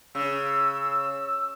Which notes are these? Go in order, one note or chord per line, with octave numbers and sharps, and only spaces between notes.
C#3 E6